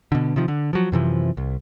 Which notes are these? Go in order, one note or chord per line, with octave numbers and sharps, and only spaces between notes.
B2 D3
C3 D#3 F3
D3
F3 F#3
F#2 C3 E3 F3
C2